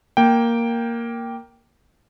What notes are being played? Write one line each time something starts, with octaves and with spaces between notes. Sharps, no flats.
A#3 G5